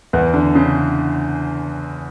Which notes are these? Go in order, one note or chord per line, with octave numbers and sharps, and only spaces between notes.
E2 E3
D3
C#3